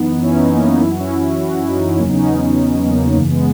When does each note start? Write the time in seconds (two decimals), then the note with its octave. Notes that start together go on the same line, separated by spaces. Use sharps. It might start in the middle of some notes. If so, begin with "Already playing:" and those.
Already playing: F#2 E3 B3 D#4
0.22 C#4 E4
0.36 B3 D#4
0.52 A#3 C#4
0.62 B3 D#4
0.71 A#3 C#4
0.81 F#2 E3 E4
0.91 F#4
1.00 C#4 E4
1.41 F#4
1.53 E4
1.67 D#4
1.81 C#4 E4
1.98 E2 C#3 F#3 A#3 C#4
2.08 B3 D#4
2.14 C#4
2.19 B3 D#4
2.88 A#3
3.16 F#2 C#3 E3 A#3
3.31 G#3 B3